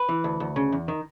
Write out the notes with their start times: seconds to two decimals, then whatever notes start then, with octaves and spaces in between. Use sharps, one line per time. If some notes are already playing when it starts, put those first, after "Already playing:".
Already playing: B4
0.09 E3
0.24 D2
0.40 D2
0.56 C#3
0.72 E2
0.88 D#3